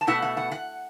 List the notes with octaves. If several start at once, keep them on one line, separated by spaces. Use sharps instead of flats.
A5
B2 A3 E4 F#5
F#5
F#5
F#5